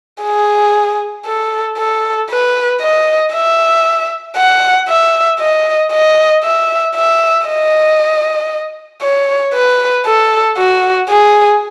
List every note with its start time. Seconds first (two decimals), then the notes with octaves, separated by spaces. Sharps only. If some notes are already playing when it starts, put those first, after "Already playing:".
0.23 G#4
1.26 A4
1.78 A4
2.30 B4
2.81 D#5
3.34 E5
4.37 F#5
4.89 E5
5.40 D#5
5.92 D#5
6.44 E5
6.95 E5
7.47 D#5
9.02 C#5
9.54 B4
10.06 A4
10.58 F#4
11.10 G#4